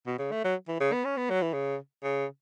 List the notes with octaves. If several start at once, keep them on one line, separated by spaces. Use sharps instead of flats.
B2
C#3
A3
F#3
E3
C#3
B3
C#4
B3
F#3
E3
C#3
C#3